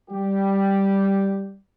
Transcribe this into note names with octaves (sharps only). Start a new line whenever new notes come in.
G3 G4